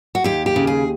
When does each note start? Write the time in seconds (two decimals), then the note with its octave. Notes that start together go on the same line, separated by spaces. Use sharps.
0.15 F#4
0.24 D#2 G4
0.46 G4
0.56 C#3
0.67 G#4